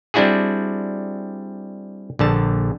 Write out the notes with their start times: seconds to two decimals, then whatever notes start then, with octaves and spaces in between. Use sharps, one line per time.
0.14 G3 C4 D4 E4 F#4 G#4
2.19 A#1 D3 A5